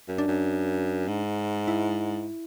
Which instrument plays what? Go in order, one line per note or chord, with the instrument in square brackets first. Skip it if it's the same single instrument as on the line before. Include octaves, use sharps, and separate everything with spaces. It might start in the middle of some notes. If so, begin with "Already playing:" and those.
[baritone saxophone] F#2
[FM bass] D4
[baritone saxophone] F#2
G#2
[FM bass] E4